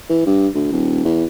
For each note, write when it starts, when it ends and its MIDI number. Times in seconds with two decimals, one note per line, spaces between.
0.09 0.22 52
0.26 0.48 43
0.55 0.70 38
0.72 1.05 27
1.05 1.25 40